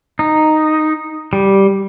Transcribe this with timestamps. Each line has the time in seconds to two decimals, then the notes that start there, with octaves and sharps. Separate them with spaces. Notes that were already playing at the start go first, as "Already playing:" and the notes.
0.19 D#4
1.33 G3